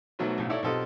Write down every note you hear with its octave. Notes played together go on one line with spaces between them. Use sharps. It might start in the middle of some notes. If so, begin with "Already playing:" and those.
G#2 B2 F#3 A3
B1 A2 C#3
D#4 E4 A4 C#5 D5
B1 C4 F4 G4 A4 D#5